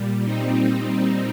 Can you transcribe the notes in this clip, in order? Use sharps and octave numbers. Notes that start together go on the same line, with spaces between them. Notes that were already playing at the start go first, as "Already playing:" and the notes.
Already playing: A#2 G3
C4 D#4
C4 D#4